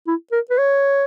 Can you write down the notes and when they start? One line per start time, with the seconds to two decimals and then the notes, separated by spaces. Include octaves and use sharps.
0.07 E4
0.32 A#4
0.50 B4
0.58 C#5